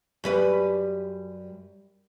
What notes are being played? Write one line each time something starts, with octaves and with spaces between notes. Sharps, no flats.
F#2 G3 B4